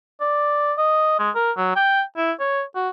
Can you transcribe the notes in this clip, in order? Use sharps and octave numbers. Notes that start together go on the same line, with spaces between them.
D5
D#5
G#3
A#4
F#3
G5
E4
C#5
F#4